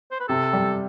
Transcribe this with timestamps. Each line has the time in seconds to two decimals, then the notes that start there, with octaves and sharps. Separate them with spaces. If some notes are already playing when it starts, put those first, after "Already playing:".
0.12 C5
0.20 B4
0.28 C3 A4
0.53 G3